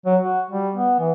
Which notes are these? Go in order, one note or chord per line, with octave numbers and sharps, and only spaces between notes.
F#3
F#4
G3
B3
E3